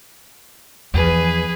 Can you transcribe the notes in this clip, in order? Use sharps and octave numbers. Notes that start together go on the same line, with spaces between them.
E2 F3 G#4 B4